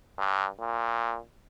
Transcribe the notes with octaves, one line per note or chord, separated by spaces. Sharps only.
G2
A#2